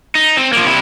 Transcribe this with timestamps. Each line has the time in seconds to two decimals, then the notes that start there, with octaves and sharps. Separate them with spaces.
0.15 D#4
0.37 C4
0.53 F3 A#3
0.65 C3 E4